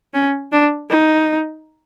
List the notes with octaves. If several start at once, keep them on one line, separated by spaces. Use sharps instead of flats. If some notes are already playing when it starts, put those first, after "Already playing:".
C#4
D4
D#4